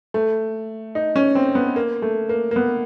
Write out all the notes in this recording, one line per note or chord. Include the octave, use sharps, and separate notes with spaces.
A3
D#4
C#4
C4
B3
A#3
A3
A#3
A#3
B3